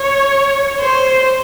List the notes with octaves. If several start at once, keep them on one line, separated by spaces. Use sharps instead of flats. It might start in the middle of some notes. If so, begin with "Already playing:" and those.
Already playing: C#5
C5